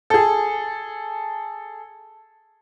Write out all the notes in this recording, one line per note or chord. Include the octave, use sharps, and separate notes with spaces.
G#4 A4